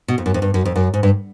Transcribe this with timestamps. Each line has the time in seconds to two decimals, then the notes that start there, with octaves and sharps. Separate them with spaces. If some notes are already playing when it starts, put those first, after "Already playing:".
0.08 B2
0.18 F2
0.26 F#2
0.34 F2
0.42 G2
0.54 F#2
0.65 F2
0.76 F#2
0.94 G#2
1.03 G2